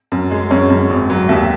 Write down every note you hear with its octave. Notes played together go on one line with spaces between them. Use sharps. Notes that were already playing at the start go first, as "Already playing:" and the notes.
F#2
G#3
F#2 C#5
F#2
G#1
F#3
D#2 E5